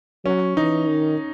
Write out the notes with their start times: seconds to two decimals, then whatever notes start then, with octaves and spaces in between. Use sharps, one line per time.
0.25 F#3 C#4
0.57 E3 D#4
0.88 D#3